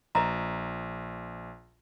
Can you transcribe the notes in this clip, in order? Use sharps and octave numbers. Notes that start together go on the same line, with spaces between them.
A#1 B4 D#5 A#5